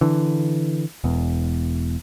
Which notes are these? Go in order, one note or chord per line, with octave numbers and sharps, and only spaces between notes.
D3 E3
E1 E2